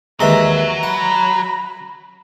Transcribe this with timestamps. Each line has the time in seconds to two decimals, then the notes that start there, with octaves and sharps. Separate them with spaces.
0.20 D#2 E3 F#3 G#3 E5 A#5
0.83 F#5 B5